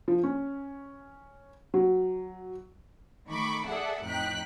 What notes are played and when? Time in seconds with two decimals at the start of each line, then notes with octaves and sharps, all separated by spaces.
0.08 F3
0.23 C#4
1.74 F#3
3.29 D#3 A3 B5 C#6 D6
3.67 G#4 A4 D5 E5 F#5
4.04 F2 A2 D#4 G5 F#6 B6